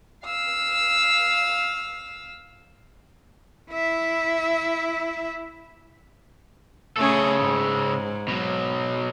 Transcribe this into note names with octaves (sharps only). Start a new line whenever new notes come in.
F5 E6
E4 E5
C#3 A3 C#4 G#4 A4
G#2
B2 F#3